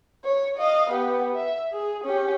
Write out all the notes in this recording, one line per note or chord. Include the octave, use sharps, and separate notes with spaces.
C#5
D#5 F5
B3 G4
E5
G#4
C#4 G4